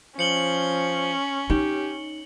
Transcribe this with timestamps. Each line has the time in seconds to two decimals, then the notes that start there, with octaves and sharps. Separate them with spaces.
0.19 F3 C#4 C#7 F#7 G7
1.50 D#4 G4